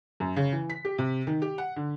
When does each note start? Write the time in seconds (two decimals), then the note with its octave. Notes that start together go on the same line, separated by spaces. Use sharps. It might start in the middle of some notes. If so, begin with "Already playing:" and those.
0.20 F#2
0.36 C#3
0.52 E3
0.70 B6
0.85 G4
0.98 C3
1.27 D#3
1.42 G4
1.58 F#5
1.76 D3